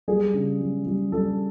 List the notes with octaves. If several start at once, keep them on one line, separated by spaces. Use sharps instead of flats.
G3 G#4
C#3
G3
G3
G3 A4